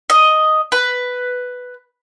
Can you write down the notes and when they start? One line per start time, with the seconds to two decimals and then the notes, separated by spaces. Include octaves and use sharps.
0.10 D#5
0.72 B4